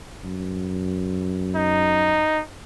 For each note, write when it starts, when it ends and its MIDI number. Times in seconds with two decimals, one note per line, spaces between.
0.25 2.24 42
1.56 2.42 63